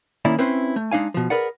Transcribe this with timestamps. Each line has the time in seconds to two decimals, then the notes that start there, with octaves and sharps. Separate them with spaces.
0.25 D#3 A#3 C#4 E4 D5
0.38 C4 C#4 E4 B4 C5
0.76 A3
0.91 G#3 D4 D#4 F5 G#5
1.14 B2 F3
1.30 G#4 A#4 B4 D5 F#5